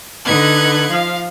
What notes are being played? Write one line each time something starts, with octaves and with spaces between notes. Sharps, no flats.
D3 D#4 B4 F#6 G#6
F3 F5